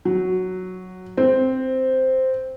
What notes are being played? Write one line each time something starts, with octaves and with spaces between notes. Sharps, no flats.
F#3
C4